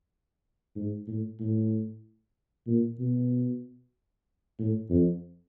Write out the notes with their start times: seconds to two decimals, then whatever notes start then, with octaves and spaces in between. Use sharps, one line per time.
0.76 G#2
1.08 A2
1.40 A2
2.67 A#2
3.00 B2
4.59 A2
4.90 F2